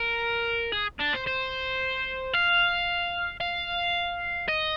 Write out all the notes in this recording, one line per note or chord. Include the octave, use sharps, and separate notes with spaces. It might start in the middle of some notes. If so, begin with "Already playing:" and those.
Already playing: A#4
G#4
D4
C5
C5
F5
F5
D#5